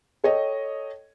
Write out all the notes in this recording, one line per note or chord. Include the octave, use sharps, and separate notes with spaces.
A4 C#5 D#5 G5